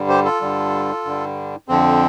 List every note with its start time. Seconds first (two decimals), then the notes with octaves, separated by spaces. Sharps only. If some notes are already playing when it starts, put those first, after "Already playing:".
Already playing: G2 D3 G3
0.09 G4 C5
0.24 F4 A4
0.41 G2 D3 G3
1.05 G2 D3 G3
1.68 F2 D3 F3 C4